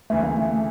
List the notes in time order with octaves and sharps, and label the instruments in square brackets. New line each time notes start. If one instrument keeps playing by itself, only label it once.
[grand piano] D2 C#3 E3 [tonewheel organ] A3
[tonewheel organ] A#3
A3